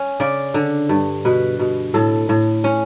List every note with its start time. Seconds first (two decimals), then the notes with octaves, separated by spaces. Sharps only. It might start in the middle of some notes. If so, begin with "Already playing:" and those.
Already playing: C#4
0.20 C#3 D5
0.54 D3
0.89 G2
1.25 B2 B4
1.59 B2
1.94 A2 A4
2.29 A2
2.64 C#4